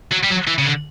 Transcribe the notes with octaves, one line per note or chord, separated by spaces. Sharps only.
F#3
G3
F#3
E3
C#3
D3